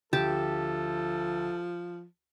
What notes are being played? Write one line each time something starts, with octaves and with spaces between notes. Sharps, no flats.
D2 F3 G4 A4 A5